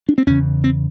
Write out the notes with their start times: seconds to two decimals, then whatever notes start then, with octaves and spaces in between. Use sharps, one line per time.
0.09 D4
0.18 C4
0.27 E2 C#3 C#4
0.64 C4